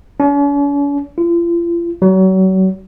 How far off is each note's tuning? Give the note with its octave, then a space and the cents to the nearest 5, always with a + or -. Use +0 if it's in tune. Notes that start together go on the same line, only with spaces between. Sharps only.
C#4 +45
F4 -40
F#3 +35